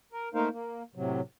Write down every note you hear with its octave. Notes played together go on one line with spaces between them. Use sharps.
A#4
A3 A#3 D#4 A#4 C5 F5
A#3
A2 C3 F#3